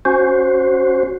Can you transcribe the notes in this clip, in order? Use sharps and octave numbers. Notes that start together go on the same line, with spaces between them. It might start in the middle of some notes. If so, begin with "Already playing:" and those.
C#4 F#4 C5